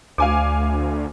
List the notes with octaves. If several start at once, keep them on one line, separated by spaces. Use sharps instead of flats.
D2 F5 G#5 D6